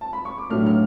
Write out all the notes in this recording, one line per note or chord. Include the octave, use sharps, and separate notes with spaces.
A5
B5
C#6
D6
A2 F#3 A3 D4 F6
F6